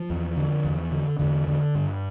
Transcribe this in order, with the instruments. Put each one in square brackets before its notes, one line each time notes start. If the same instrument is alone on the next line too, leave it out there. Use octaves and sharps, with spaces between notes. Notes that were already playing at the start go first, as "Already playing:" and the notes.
Already playing: [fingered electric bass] F3
E2
D3
E2
D3
E2 D3
D3
G2